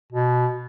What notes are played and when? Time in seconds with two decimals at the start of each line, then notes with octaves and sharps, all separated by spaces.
0.13 B2